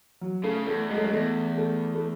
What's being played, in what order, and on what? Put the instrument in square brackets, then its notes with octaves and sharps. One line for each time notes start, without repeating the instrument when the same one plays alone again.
[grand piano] F#3
[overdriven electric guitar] C#3 [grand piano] A3
[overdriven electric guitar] E2 [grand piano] A3
[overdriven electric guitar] F#2 [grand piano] G#3
[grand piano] A3
G#3
[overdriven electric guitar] E2 [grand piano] A3
[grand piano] A3
A3